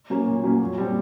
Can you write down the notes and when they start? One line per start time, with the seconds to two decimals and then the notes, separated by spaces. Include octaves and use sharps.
0.10 F#3 A#3 C#4
0.26 A#2
0.44 F#3 A#3 C#4
0.61 A#2
0.78 G3 C4